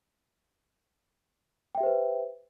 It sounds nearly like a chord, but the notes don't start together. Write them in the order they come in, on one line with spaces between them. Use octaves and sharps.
G5 E5 G4 C5 B4